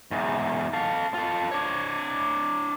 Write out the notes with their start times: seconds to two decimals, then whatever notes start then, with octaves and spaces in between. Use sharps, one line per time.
0.11 E2 G#2
0.73 A4 F5
1.14 F4 A4
1.51 D4 C#5